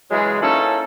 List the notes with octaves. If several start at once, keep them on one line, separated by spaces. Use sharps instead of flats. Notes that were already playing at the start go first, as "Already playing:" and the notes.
C#3 E3 F#3 G#3
A#3 C#4 D#4 E4 A4